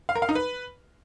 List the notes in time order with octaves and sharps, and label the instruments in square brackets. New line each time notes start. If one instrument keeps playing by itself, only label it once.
[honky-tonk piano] F5
A#4
F5
D#4
B4